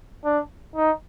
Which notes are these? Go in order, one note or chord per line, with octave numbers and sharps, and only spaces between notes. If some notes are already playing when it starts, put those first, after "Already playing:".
D4
D#4